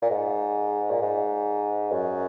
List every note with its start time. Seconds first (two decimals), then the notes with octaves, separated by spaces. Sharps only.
0.02 A#2
0.10 G#2
0.91 A#2
1.02 G#2
1.92 F#2